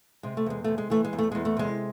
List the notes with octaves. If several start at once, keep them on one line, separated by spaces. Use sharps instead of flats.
C3 G#3
A3
E2 G#3
C3 A3
G#3
E3 A3
G#3
E2
A3
E2 G#3
A3
C3 G#3